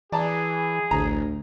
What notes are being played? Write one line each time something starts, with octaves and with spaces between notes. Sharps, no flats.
E3 G#4 D5 A5 A#5
A1 D2 A#5